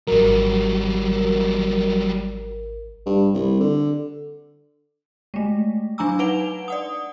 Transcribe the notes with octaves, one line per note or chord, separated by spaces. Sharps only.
G#1 F#3 G3 A#4
G2
C2
D3
G#3 A3
F#3 D4 G#5 A#5 D6 E6
D#4 B4 F#5 D7 F7 G7
D5 F#5 D#6